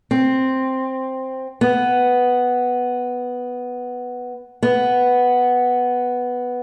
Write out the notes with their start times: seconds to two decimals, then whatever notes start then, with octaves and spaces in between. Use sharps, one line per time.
0.11 C4
1.61 B3
4.63 B3